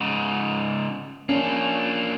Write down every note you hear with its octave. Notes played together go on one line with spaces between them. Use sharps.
G#2 C#3
A#3 C#4 D4